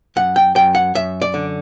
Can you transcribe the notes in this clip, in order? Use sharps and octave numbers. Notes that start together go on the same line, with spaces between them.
F#2 F#5
G5
F#2 G5
F#5
F#2 E5
D5
D3